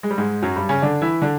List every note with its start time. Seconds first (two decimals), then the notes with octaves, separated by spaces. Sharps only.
0.03 G#3
0.11 G3
0.18 G#2 G#3
0.42 F#2 F#3
0.56 G2 G3
0.69 C#3 C#4
0.82 D3 D4
1.02 E3 E4
1.22 D3 D4